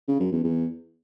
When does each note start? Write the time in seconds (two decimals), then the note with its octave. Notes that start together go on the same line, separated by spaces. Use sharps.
0.08 C#3
0.20 F#2
0.32 E2
0.44 E2